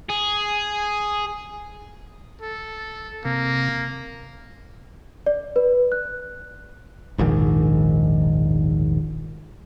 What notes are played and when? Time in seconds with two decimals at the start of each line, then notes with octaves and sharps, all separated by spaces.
0.09 G#4
2.42 A4
3.25 C3 A#3
5.26 D5
5.56 B4
5.92 F#6
7.18 E1 A#1 G#2 D#3